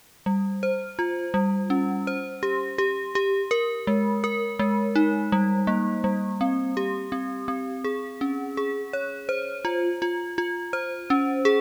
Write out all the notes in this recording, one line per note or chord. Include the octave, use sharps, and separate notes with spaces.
G3
C5
F4
G3
C#4
C5
G4
G4
G4
A#4
G#3
A#4
G#3
D#4
G3
A#3
G3
C4
G4
C4
C4
G#4
C#4
G#4
C#5
C5
F4
F4
F4
C5
C#4
G#4